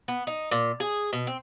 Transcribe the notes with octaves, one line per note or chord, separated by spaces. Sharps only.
B3
D#4
A#2
G#4
B2
C4